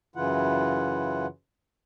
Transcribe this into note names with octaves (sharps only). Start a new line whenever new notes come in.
F#2 C#3 E3 E4 F4 F#5